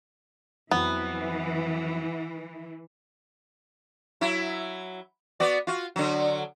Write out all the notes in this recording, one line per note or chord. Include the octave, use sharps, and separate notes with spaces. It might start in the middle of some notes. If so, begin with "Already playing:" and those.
F2 E3 F#3 B3 E4
F#3 E4
B3 F#4 D5
F4 F#4
D3 F#3